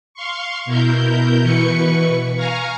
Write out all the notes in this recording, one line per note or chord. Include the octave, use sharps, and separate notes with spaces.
F5 C6 C#6
B2 E4 A#4 G6
B2 E3 B4 C#6 C#7
F5 G#5 A#5 C#6 F6